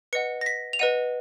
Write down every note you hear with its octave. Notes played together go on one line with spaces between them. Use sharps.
B4 D#5 F#5 C#7
A#6
B6
F7
B4 D#5 F#5 D#7